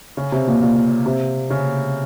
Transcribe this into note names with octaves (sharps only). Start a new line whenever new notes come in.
C#3
C3
A#2
A#2
C3
C#3